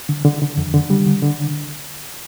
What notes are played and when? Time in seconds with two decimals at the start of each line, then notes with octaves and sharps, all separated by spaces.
0.09 D3
0.25 D3
0.42 D3
0.57 F2
0.74 D3
0.90 G3
1.06 D3
1.22 D3